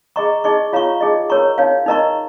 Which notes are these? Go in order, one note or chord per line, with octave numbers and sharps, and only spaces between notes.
G#4 D#5 A#5 C#6
D#4 G#4 D#5 C#6
F4 C#5 F5 A#5 C#6
D#4 G#4 D#5
A#4 C#5 A#5 C#6
D#4 C#5 F5
D#4 A#4 D#5 A#5 C#6